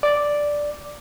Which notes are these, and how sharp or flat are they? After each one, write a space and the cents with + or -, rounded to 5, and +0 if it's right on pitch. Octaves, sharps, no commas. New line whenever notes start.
D5 +0